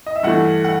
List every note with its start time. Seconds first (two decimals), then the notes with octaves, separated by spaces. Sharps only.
0.06 D#5
0.16 E5
0.23 G2 E3 A3 F#5
0.65 F#5